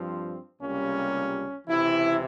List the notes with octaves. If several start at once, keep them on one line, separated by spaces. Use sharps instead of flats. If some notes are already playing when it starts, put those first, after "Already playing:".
Already playing: G2 F3 C4
C#2 C3 G3 A#3 C#4
C#2 C3 E3 E4